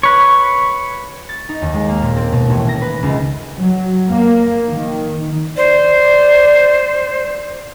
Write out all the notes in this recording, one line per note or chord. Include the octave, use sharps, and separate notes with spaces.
B4 C#5
A6
D#4
D#2
G#3
A#3
A#2
C4
B2
A1
A#6
B4
C#2
F#3
A#3
D#3
C5 D5